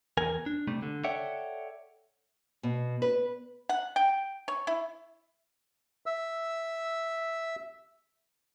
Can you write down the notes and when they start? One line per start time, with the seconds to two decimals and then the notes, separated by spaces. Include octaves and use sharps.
0.17 E2 A#4 G#5
0.46 D4
0.68 C3 G3 A3
0.82 D3
1.04 A4 C#5 D5 E5 F#5 G5
2.63 B2
3.02 B4
3.69 F#5
3.96 G5
4.48 C#5
4.67 E4
6.06 E5 E6